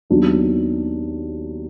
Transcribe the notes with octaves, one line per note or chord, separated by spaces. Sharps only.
D#2 D#3 F#3 B3 D4